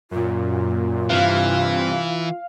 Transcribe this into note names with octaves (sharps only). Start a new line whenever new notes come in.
F#2 A#2 F4
G2 C3 E3 F5